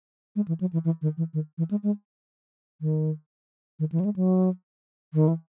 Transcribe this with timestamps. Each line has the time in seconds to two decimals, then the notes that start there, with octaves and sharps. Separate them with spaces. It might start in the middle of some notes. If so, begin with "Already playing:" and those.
0.36 G#3
0.48 E3
0.60 F#3
0.73 E3
0.84 E3
1.02 D#3
1.17 E3
1.33 D#3
1.58 E3
1.71 G#3
1.83 G#3
2.81 D#3
3.79 D#3
3.92 E3
4.00 F#3
4.05 G#3
4.16 F#3
5.14 D#3
5.28 E3